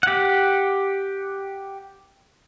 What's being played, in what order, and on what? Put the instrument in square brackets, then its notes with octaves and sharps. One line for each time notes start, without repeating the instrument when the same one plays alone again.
[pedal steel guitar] G4 F#5